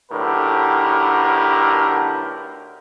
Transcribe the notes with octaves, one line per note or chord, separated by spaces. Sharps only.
B1 A2 D3 G4 A#4 B4